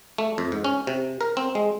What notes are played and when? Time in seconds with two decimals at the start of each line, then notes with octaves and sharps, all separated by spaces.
0.18 A3
0.38 F2
0.52 G#2
0.64 C#4
0.87 C3
1.21 A#4
1.37 C4
1.55 G#3